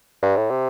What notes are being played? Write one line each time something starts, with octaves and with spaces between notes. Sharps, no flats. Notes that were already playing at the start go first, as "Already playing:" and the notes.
G2
A2
C3